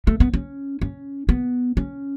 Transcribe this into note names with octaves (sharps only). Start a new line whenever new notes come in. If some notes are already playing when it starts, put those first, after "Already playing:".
A3
B3
C#4
C#4
B3
C#4